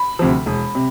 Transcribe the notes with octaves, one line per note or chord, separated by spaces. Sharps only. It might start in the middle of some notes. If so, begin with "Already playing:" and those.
Already playing: B5
D2 C3 F3
E1
C3